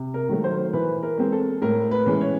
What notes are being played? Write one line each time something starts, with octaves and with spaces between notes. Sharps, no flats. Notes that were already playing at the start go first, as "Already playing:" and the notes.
Already playing: C3
A#4
D#3 F#3 A3
C5
E3 B4
A#4
G#3 C4
A4
A2 A#4
B4
E3 G#3 C#4
C#5